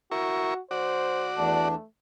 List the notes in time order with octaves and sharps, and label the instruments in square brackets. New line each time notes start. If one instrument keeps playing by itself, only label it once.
[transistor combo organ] E4 A#4 C#6 [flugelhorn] F#4
[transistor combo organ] F#4 D5 [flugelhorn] C5
[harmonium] E2 D4 [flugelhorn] A3